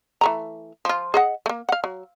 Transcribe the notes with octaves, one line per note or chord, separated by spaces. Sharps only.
E3 A3 A#5
F3 F4
G#4 D#5 F#5
A3 A#3
F5 F#5
F#3